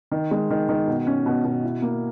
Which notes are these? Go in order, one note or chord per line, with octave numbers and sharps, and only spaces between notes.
D#3
G#3
D#3
D#3
B2
C#4
B2
B2
E4
A#3